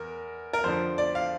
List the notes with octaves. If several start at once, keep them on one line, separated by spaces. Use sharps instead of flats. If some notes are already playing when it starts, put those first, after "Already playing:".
Already playing: E2 A#4
A#4
F2 D3 F3 C5
D5
F5